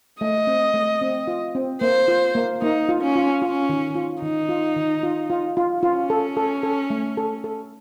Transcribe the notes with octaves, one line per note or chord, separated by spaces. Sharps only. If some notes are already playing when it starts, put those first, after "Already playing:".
A3 D#5
C4
A3
C4
F4
C4
A#3 C5
F4
A#3
A#3 D#4
F4
C#4
F4
C#4 F4
D#3
F4
D#3 D#4
F4
D#3
F4
F4
F4
C#4 F4
A4
A4
A4
A3
A4
A4